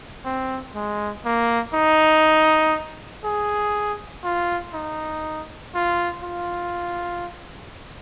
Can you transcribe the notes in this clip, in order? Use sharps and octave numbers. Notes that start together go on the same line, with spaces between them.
C4
G#3
A#3
D#4
G#4
F4
D#4
F4
F4